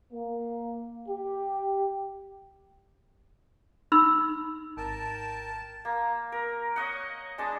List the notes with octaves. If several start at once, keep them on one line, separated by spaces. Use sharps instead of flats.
A#3
G4
D#4 B5 E6
G#1 A#4 G5 A5
A#3
A#4
C#5 D#5 F#5
G#3 D4 A5